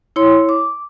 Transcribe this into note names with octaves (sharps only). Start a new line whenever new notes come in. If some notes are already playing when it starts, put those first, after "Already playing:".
E4 C#5 C6
D6